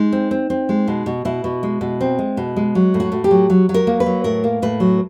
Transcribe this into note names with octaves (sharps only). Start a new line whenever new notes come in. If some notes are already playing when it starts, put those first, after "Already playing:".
Already playing: G#3 D#4
C4
C4
C4
G#3
B2
B2
B2 E4
B2
G#3
B2
C4
G#3
B2
G#3
F#3
A2
F#4
A2
G4
F#3
F#3
F#3
A#4
A#3
B4
F#3
A2 A#4
A#3
A2 B4
F#3